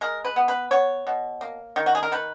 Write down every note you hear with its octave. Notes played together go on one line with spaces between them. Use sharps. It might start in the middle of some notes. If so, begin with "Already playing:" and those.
G#3 A#4
B4
B3
B4
B3 C#5
B2
A#3
D#3
F#4
G#4
A#4
D#3 B4